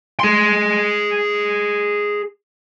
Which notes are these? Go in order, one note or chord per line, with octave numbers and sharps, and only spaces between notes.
G#4 C6